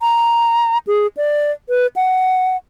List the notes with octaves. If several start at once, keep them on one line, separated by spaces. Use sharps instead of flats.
A#5
G#4
D5
B4
F#5